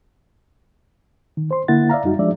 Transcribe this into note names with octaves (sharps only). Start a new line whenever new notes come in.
D#3
C5 C6
D3 A#3 E4 F#5 A6
D5 E5 F5 A#5
F#2 G3 D#4 F#4
F3 G#3 D4 D5 E5